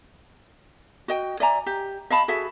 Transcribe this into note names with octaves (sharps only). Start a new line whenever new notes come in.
F#4 D#5 G5
D5 E5 G#5 A#5
G4
D#5 F5 A5 B5
F#4 G#4 A4 E5